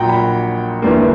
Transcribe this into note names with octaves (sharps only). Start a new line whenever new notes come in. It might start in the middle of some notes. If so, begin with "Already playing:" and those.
Already playing: A#1 A#2 F#3 F#5 G5 A#5
B5
G1 G2 E3 A#3